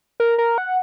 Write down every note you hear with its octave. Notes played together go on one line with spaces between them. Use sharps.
A#4
A#4
F#5